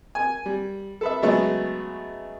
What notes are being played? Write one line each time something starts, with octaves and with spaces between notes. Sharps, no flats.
G#5
G3
A4 B4 E5
C#3 F#3 G#3 A3 B3